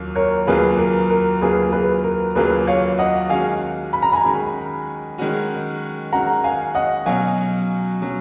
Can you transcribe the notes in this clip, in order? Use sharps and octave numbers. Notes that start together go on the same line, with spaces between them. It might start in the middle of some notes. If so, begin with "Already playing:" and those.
Already playing: D#2 C#3 F#3 A#3 F4
A#4 C#5
D#2 C#3 F#3 A#3 F4 G#4 B4
A#4
A#4
D#2 C#3 F#3 A#3 F4 G#4 B4
G#4 B4
A#4
D#2 C#3 F#3 A#3 F4 G#4 B4
C#5 F5
D#5 F#5
D#3 G#3 C#4 F#4 F5 G#5
B5
A#5
G#5 B5
D#3 G#3 C#4 F#4
D#3 G#3 C#4 F#4
D#3 G#3 C#4 F#4 F#5 A#5
F5 G#5
D#5 F#5
B2 F#3 C#4 F5 G#5
B2 F#3 C#4